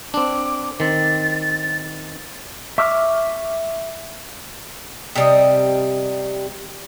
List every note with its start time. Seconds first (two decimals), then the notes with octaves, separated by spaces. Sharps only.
0.14 C4 D4 D6
0.80 D#3 C4 A6
2.78 E5 C#6 D6 E6 F6
5.15 C3 G3 D#5